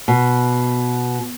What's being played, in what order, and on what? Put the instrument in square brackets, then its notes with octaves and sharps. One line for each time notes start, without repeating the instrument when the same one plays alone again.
[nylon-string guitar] B2